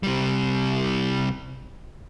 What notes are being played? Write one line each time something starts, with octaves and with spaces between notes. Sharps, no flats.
C3 G3